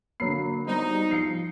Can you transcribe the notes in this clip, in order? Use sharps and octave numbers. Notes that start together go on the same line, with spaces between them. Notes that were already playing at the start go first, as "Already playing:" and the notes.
D3 F#3 A#3 B5 C7
G3 B3 D#4 C5
F3 C7 C#7